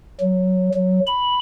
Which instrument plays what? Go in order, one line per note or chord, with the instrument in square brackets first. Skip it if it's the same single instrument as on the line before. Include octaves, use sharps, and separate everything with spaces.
[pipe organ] F#3
F#3
B5